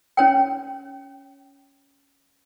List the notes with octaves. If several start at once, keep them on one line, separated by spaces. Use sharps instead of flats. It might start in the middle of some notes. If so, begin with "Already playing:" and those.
C#4 C#5 G5